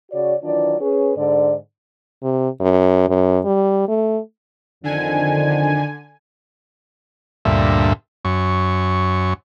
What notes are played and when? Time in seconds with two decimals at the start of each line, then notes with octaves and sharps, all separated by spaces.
0.12 C#3 F#4 C#5 D5
0.44 D#3 E3 F#3 D4 F4 D5
0.81 C#4 G#4 B4
1.17 G#2 D3 D5
2.23 C3
2.60 F#2
3.09 F#2
3.44 G3
3.88 A3
4.84 F2 D3 D#3 D4 G#5
7.45 D2 G2 A#2 E5
8.25 F#2 C#6